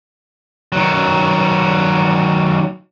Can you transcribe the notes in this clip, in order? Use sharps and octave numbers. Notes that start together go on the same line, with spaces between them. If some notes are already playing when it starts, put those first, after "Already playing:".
D#3 F#3